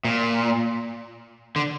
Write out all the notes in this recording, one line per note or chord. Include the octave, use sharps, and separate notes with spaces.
A#2
D3